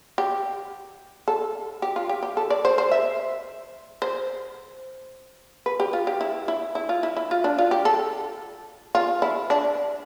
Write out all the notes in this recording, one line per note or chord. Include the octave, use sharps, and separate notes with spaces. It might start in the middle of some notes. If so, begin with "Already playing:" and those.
G4
A4
G4
F4
G4
G4
A4
D5
C5
C5
E5
C5
B4
G4
F4
G4
E4
E4
E4
F4
E4
E4
F4
D4
F4
G4
A4
F4
E4
D4